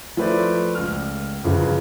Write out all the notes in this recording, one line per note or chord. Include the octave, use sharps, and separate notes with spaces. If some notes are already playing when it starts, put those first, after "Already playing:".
F3 A3 B4 C5 D5
C#2 F6
G1 C#3 F3 B4